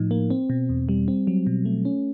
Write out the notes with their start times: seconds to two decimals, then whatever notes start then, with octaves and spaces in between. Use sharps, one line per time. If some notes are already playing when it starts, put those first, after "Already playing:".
Already playing: A2 F3 D#4
0.11 A#3
0.30 C4
0.50 B2
0.69 E2
0.89 G3
1.08 C4
1.27 F#3
1.47 B2
1.65 A3
1.85 C#4